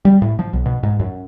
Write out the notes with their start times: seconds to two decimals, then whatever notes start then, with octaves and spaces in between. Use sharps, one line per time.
0.05 G3
0.22 A2
0.39 F3
0.53 B1
0.66 B2
0.83 G#2
0.99 F#2